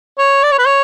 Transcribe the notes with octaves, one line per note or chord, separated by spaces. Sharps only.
C#5
D5
C#5
B4
C#5